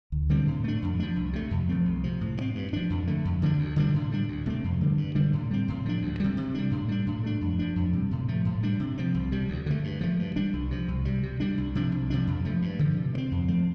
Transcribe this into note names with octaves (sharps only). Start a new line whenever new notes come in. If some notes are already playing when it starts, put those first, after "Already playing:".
D2
D3 G3 C4
A2
A3 D4
F2
F3 D4
C2
C3 A3
F2
F3 A3 C4
C2
C3 F3
A2
F3
C4
G2
F3 D4
F2
D3 A3
F2
D3 F3 D4
D2
D3 G3 D4
A2
G3 D4
D2
C3 A3 C4
F2
D3 G3
G2
D3 G3 D4
A2
G3 C4
A2
F3 D4
D2
C3 G3
C3
G3 D4
A2
G3 D4
A2
A3 D4
F2
F3 D4
F2
C3 G3
A2
F3 A3
A2
G3 D4
C3
F3 C4
C2
C3 G3
D2
D3 A3
G2
F3 A3
G2
G3 D4
C2
C3 F3
C2
C3 G3
C3
G3 D4
C2
C3 F3 D4
C2
C3 F3 D4
F2
F3 A3
G2
D3 F3
C3
A3
C4
F2
F3 A3 C4